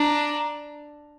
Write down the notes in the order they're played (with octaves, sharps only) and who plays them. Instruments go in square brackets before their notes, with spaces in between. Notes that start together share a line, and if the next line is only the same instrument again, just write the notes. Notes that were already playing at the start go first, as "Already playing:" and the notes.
Already playing: [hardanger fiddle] D4 [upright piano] A#5